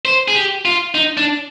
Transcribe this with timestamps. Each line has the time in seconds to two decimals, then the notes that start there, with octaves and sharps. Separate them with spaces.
0.05 C5
0.28 G#4
0.35 G4
0.65 F4
0.95 D#4
1.17 D4